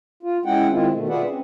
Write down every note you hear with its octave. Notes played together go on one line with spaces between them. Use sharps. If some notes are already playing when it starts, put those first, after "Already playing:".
F4
G#3 C#4 E4 F#5 G5
D#3 G#3 C4 E4 F4
B2 D#3 A3
F4 G#4 B4 D5 E5 F#5
C4 C#4